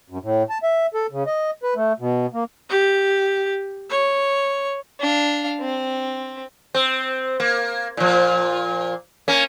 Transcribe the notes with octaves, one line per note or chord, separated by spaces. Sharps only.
F#2
A2
A5
E5
A4
C#3
D#5
B4
A3
B2
A#3
G4
C#5
D4 F5
C4
C4
A#3
A#2 F3
A#3 C#4